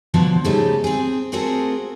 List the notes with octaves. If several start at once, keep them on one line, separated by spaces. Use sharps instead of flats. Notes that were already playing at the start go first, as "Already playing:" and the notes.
B2 D3 F3 F#3
G#2 C#3 G3 A3 D#4
C4 G#4
A3 C4 F4 F#4 G#4 A#4